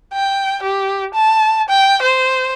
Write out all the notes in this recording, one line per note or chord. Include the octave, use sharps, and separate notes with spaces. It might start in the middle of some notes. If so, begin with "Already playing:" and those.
G5
G4
A5
G5
C5